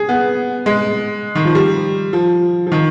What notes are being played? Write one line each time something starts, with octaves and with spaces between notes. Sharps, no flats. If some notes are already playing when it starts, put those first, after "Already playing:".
Already playing: G#4
B3
G#3
D#3
F3
G3
F3
F3
D#3